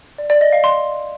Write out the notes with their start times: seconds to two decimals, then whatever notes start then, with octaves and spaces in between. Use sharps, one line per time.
0.18 D5
0.30 D5
0.41 D#5
0.52 F5
0.64 C6